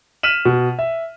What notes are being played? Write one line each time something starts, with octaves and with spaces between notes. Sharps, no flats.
F6 B6 D#7 E7 F#7
B2
E5